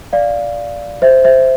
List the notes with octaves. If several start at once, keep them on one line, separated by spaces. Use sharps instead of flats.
D5 F5
C5 E5
C5 E5